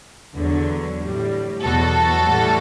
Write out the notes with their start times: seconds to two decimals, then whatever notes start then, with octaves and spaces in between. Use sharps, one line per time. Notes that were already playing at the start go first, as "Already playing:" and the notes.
0.36 E2 D3 F#3
0.99 A2 G3
1.62 E2 B2 F#3 F#4 A4
2.26 A2 E3 G3